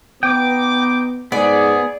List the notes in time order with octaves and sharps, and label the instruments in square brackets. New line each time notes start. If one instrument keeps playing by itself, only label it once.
[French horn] B3 [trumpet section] D#4 D6 [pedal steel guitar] G5
[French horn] G#2 [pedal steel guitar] B3 [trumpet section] G#4 [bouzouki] D5